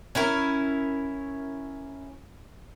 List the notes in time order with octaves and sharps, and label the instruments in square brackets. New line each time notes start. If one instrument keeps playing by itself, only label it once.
[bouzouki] C#4 E4 A#4